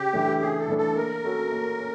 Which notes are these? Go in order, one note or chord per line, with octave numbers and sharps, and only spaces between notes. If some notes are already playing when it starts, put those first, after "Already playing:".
Already playing: C#3 G4
E3 A3 D4
C#3 G#4
A4
E3 A3 D4
A4
A#3 A#4
C#4 F#4 A4
A#3
C#4